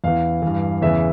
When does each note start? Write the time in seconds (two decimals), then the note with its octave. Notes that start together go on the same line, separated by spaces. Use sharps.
0.04 E2 E3 F5
0.42 G2 E3
0.82 E2 C#3 E3 E5